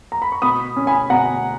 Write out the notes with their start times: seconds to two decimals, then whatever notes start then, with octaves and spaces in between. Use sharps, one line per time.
0.12 A#5
0.22 B5
0.32 C#6
0.42 B2 B5 D#6
0.76 C#4
0.87 G#5 B5
1.10 B2 F#5 A#5